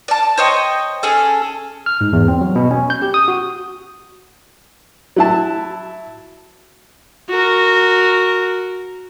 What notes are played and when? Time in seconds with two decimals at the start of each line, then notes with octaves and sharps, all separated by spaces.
0.08 D5 A5
0.38 C5 C#5 D#5 G5
1.03 C#4 G#4 A4
1.86 F6
2.01 G#2
2.13 E2
2.28 C4
2.41 F#3
2.56 B2
2.71 C#4
2.90 G6
3.02 G4
3.14 D#6
3.28 F#4
5.16 F#3 E4 A5
7.29 F#4 A#4